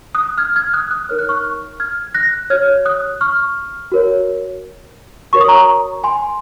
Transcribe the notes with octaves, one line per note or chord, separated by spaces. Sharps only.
D#6 F#6
F6 G#6
F6 G#6
D#6 F#6
D#6 F#6
D#4 A#4 C#5 F6
F#6
C#6 F6
F6 G#6
F#6 A#6
F#4 C#5 F6 G#6
D#6 F#6
C#6 F6
F#4 A#4 C#5
F#4 A#4 C#5 C#6
D#6
A#5 C#6
G#5 C6